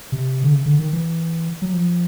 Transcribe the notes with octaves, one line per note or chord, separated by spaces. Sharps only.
C3
D3
C#3
D3
D#3
E3
F#3
F3